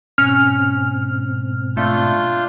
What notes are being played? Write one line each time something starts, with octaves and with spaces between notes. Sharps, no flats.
G#2 B2 C4 C#4 F6
A3 D4 F4 G6